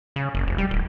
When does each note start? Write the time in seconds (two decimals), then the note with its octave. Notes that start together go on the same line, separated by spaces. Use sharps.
0.16 C#3
0.35 F#1
0.47 F1
0.58 G3
0.71 D1